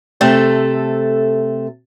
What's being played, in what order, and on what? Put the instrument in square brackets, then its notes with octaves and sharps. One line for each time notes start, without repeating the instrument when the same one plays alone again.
[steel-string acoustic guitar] C3 A3 A4